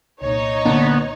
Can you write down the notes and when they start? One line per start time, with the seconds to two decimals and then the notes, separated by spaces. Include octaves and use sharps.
0.22 C2 A#2 D#4 C#5
0.65 D3 A#3 B3 D4